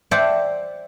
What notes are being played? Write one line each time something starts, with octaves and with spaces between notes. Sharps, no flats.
C5 D5 E5 F#5 G5 A5